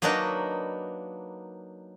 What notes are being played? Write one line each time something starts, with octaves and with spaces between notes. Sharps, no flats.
F#3 A#3 D4 D#4 A#4 B4